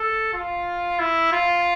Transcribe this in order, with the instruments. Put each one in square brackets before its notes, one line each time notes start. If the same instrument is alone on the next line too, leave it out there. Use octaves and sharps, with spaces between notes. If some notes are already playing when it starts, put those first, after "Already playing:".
Already playing: [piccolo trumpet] A4
F4
E4
F4